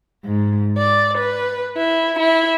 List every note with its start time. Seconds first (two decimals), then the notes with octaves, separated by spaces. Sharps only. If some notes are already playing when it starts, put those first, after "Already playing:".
0.25 G#2
0.78 D5
1.18 B4
1.78 E4
2.19 E4